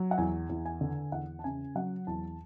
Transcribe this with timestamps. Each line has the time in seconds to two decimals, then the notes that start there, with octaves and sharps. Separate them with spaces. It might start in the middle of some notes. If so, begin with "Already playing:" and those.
Already playing: F#3
0.11 F#5
0.18 E2 G#5
0.49 E2
0.65 G#5
0.81 D3
1.12 E2 F#5
1.39 A5
1.44 C#3 G#5
1.75 F#3 F#5
2.07 E2 A5